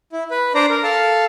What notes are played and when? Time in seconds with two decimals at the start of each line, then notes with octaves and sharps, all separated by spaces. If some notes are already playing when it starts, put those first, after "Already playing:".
0.12 E4
0.31 B4
0.55 D4 C5 D5 A#5
0.70 A#4
0.83 A4 F5 A5